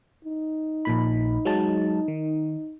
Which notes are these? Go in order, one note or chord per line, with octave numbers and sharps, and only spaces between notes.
D#4
A#1 A#2 B5
F#3 G#3 A5
D#3